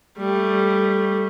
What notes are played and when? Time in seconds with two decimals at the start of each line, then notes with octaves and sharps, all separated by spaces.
0.18 G3 A3